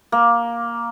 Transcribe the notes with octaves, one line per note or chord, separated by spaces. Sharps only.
A#3